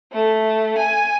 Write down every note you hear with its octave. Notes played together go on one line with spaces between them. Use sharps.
A3
G#5